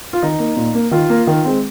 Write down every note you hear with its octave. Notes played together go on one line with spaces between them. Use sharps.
F4
D#3 D#4
A#3
A#2
A#3
D#3 F4
A#3
D#3
G#3 C4